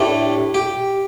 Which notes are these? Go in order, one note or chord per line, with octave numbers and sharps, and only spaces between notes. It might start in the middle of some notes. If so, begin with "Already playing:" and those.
Already playing: A2 A3 D4 G4
G4